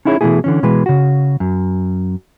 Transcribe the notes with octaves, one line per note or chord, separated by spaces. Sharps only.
C#4 D#4 E4 G#4 C#5
B2 E3 F3 A3 E4 G#4
D3 E3 C#4
B2 E3 G#3 B4
C#3 F#4
F#2